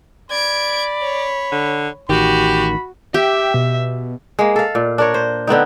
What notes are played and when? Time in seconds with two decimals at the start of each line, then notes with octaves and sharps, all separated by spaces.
0.31 D5 B5 G#6 D7
1.03 C#5
1.52 D3
2.09 A1 D#3 F#4 G4 B5
3.14 G4 E5 G5
3.54 B2
4.39 G#3 A#3
4.56 A4 F5
4.75 A#2
4.98 D4 A#4 C#5
5.14 C5
5.47 D3 B3 C4 D#4